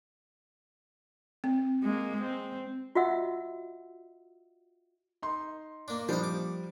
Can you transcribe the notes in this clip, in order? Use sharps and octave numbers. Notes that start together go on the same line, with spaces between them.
C4
G#3 A#3
C4
F4 F#4 D#5 E5 F#5 E6
D#4 C6
A#3 D4
F3 G3 D4 C5 D#5
D6